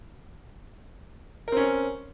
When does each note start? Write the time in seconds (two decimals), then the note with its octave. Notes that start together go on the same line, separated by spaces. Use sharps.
1.48 A#4
1.52 C4
1.57 C#4